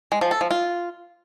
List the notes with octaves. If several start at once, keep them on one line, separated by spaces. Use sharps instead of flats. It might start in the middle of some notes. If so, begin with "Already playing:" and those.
G#3
F3
A4
F3
F4